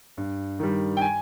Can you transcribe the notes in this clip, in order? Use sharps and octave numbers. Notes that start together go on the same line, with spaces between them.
G2
D#3 G3
G5
G#5